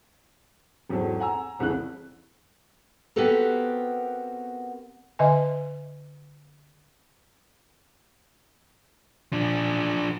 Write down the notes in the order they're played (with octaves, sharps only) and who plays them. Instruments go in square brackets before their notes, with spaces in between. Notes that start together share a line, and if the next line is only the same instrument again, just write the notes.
[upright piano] G#1 E2 F#3 C4 A4
F#5 G#5 A#5 E6
F1 C2 C#3 E3 A4 F#6
[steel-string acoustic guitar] B3 C4 F#4 G4 A4 A#4
[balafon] D3 D#5 E5 G#5
[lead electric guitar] F3 D4